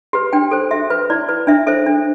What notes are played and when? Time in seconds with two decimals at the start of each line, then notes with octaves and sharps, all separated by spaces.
0.13 G4 B4
0.33 D4 G5
0.51 A4 C5
0.71 F#4 E5
0.90 B4
1.10 E4 D5
1.29 B4
1.47 D4 E5
1.67 A4 C5 E5
1.87 D4